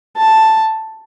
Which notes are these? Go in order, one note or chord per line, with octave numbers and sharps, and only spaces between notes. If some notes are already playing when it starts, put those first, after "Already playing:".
A5